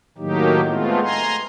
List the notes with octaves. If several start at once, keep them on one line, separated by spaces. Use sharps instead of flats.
A2 D#3 F#3 A#3 D#4 G4
G#3 A3 B3 C4 F4
G#5 A#5 C6